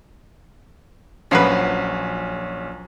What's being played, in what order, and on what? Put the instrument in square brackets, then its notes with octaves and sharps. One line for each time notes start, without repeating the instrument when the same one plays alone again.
[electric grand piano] A#1 C#4 C7 [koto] F3 F#3 B4